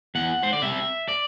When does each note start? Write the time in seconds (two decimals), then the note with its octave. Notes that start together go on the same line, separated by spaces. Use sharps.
0.15 E2 F#5
0.43 C5
0.53 D5
0.62 C3 G3 E5
1.08 D5